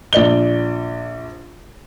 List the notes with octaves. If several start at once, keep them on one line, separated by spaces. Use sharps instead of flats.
A#1 D5 G7